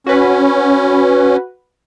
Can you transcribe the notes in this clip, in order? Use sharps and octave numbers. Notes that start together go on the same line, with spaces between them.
C#4 F#4 B4